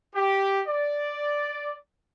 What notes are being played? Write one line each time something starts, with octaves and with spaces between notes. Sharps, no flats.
G4
D5